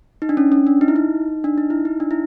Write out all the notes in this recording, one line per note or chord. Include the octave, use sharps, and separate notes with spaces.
D#4
D4
C#4
C#4
D4
D#4
E4
D#4
D4
D#4
E4
D#4
D4
E4